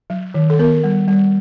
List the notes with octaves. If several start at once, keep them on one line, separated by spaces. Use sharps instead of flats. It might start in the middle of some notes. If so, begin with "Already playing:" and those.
F#3
D#3
A4
B3 A#4
G3
G3